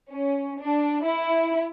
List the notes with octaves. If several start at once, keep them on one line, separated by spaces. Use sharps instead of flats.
C#4
D4
E4